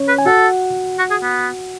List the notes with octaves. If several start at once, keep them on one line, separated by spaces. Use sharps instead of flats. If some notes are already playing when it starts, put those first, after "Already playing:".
Already playing: C#4 C#5
B4
G#5
F#4 A4 F#5
F#4
G#4
B3